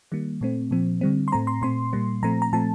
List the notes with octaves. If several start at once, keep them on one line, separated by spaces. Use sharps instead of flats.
D#3 G3 A#3
A#2 A3 C4
A#2 F3 C4
D3 G3 C4
C6
A2 A3 C4 A#5
C6
A#2 A3 C4 C6
A#2 G3 A#3
A#2 F3 A3 C4 A#5
A#5
A#2 F3 A3 C4 A5